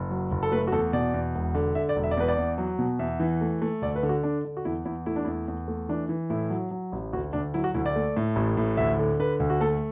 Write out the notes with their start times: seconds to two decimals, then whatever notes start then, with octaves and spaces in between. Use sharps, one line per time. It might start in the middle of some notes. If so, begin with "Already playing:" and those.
Already playing: F#1
0.11 F#3
0.31 F#1
0.43 A4
0.52 A3 B4
0.67 F#4
0.72 E2 A4
0.93 B2 D5
1.14 E2
1.35 E1
1.55 D3
1.75 D3 E5
1.89 D5
1.96 E1
2.04 E5
2.11 D5
2.17 E2 B4
2.28 D5
2.38 E2
2.58 F#3
2.79 B2
2.99 E2 E5
3.20 E3
3.41 A3
3.62 A3
3.82 D2 D5
3.96 B4
4.03 D3
4.09 F#4
4.23 D3 D4
4.45 D3
4.57 F#4
4.65 E2 E4
4.85 E2 E4
5.06 A3 E4
5.16 D4
5.24 E2 E4
5.48 E2
5.68 A3
5.89 E3 D4
6.09 E3
6.30 A2 E4
6.50 F#3
6.71 F#3
6.92 A1
7.13 D2 F#4
7.33 D2 D4
7.54 F#3 E4
7.64 F#4
7.74 D2 E4
7.86 D5
7.96 A3
8.17 A2
8.36 A1
8.57 A2
8.77 D2 E5
8.99 D3
9.19 D3 B4
9.40 D2
9.50 F#4
9.61 A3 A4